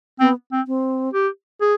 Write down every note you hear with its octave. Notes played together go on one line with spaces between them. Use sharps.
B3 C4
C4
C4
G4
G#4